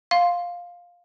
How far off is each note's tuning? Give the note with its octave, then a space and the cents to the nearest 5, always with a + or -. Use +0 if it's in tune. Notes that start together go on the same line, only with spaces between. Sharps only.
F5 +10 C6 +0